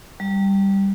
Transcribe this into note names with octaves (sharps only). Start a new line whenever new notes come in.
G3